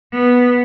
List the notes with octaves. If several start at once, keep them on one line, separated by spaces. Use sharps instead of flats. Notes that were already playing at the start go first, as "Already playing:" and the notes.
B3